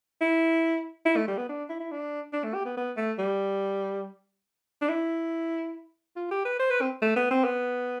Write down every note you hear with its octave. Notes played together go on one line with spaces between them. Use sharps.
E4
E4
A3
G3
B3
D4
E4
E4
D4
D4
A3
G4
B3
B3
A3
G3
D4
E4
F4
G4
B4
C5
B4
C4
A3
B3
C4
B3